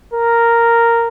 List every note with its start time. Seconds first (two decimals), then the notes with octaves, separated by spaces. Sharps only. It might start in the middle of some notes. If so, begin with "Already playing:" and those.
0.14 A#4